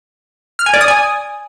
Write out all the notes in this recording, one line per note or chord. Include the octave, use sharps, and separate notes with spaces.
F6
G#5
D5
D#6
G#5